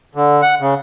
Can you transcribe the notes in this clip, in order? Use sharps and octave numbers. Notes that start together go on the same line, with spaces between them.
D3
F#5
C#3